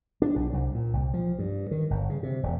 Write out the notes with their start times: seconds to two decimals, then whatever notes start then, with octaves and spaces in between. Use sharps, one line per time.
0.22 D4
0.36 B1
0.53 C2
0.74 A#2
0.93 C2
1.14 F3
1.39 G2
1.71 D#3
1.90 G1
2.10 C#3
2.23 C3
2.43 E1